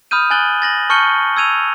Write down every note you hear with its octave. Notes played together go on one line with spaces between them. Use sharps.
B5 D#6 F6 G6 D#7
G#5 F#6 A6 F#7 G7
A6 A#6 F#7
A5 C#6 F6 G6 C#7 G7
E6 G#6 D#7 F7